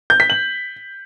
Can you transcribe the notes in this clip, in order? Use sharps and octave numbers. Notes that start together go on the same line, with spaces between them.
G6
B6
F#7